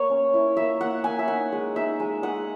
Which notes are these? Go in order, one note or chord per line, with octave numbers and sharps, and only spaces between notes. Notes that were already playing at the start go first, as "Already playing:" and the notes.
Already playing: A#3 C#5
C#4
E4
A#3 E5
A#3 F#5
A#3 G#5
E5
D#4 F#5
G#3
D#4 E5
G#3
G#3 F#5